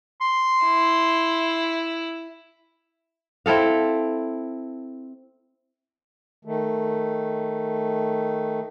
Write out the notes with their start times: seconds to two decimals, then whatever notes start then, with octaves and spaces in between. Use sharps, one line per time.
0.21 C6
0.64 E4
3.46 C4 E4 A4 F5
6.45 D#3 A3